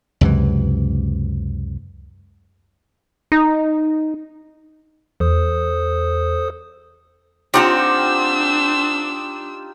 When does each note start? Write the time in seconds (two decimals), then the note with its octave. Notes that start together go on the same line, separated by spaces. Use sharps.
0.21 C#2 F#2 C3 E3
3.32 D#4
5.20 E2 A4 C5 D#6
7.54 C4 D4 D#4 F4 G4 F#5 A#5 E6